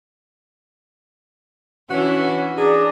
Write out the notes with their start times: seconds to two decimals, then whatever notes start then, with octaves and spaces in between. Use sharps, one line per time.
1.90 E3 C#4 D4 E4 F#4
2.57 D4 G#4 D5 A#5